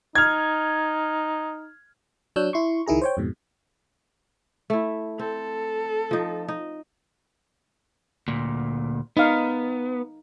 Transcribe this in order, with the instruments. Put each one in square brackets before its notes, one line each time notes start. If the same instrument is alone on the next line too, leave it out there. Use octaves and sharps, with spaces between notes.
[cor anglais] D#4 [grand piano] F6 G#6
[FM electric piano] F#3 D4 C#5 E6 F#6 G6
E4 C6 C#6
C#2 D#3 E4 G#4 A#5
C5 C#5 G5
F2 G#2 B2
[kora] A3 E4
[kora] C4 [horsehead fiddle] A4
[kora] F3 D#4
D#4
[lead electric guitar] D2 A#2
[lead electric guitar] B3 [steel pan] D#4 F5